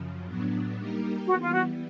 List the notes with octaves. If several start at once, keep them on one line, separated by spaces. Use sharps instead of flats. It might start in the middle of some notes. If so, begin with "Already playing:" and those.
Already playing: F#2 C#3 F3
A2 F#3 B3 D4
G3 A#3 D#4 G4 A#4
E3 G3 B3 F#4
F4
F#4